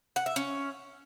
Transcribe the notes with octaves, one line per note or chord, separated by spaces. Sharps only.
F#5
E5
C#4